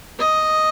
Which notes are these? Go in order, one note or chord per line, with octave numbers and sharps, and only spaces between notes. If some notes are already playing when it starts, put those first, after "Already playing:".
D#5